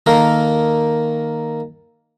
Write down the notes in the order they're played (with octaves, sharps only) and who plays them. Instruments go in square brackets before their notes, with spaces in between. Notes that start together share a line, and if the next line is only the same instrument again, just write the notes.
[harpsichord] D#3 A#3 A4 A#4